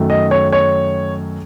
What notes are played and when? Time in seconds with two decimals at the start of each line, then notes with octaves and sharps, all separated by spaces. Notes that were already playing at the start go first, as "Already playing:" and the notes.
Already playing: F#2 D#3 A3
0.10 D#5
0.31 C#5
0.52 C#5